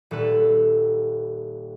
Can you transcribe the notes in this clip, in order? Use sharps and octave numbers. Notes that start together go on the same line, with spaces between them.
D#1 A4 B4